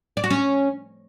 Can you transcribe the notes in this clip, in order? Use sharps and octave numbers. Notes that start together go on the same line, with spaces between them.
D5
F#4
C#4